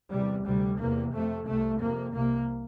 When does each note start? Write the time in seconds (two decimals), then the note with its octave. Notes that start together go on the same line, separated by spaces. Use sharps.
0.11 E2 C3 G3
0.44 D2 C3 G3
0.78 E2 C3 A#3
1.12 F2 C3 A3
1.47 C2 C3 A3
1.80 F2 C3 A#3
2.14 C2 C3 A#3